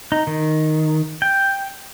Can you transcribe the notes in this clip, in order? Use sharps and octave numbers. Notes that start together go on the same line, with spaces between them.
D#4
D#3
G5